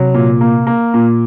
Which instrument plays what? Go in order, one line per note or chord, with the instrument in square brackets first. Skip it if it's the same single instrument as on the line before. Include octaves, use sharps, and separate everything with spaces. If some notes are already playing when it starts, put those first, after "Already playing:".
Already playing: [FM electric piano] C3 [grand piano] F#3
[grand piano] A#2
A#3
A#3
A#2